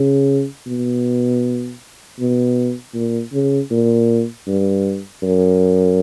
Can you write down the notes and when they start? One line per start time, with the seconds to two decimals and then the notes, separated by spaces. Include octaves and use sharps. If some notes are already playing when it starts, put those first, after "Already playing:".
Already playing: C#3
0.67 B2
2.20 B2
2.95 A#2
3.33 C#3
3.71 A#2
4.47 G2
5.23 F#2